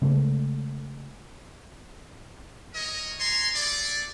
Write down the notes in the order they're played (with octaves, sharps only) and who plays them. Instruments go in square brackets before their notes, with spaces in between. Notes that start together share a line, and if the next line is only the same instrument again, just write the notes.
[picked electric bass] C#3 G#3 A3
[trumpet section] A#4 C#5 D#5
C#5 G#5 A#5 C6
A3 G#4 D5